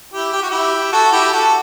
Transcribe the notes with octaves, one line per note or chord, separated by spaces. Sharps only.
E4 G4
G4
F#4
E4 G4
F#4 A4
E4 G4
F#4 A4